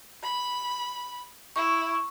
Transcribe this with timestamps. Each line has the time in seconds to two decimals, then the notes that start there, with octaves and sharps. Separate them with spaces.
0.23 B5
1.56 E4 C#6